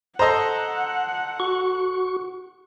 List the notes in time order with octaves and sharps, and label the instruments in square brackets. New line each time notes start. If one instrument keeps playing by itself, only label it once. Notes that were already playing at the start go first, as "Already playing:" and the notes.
[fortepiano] A4 A#5 [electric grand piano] C5 D#5 C6 [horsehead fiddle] F#5
[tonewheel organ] F#4 C#6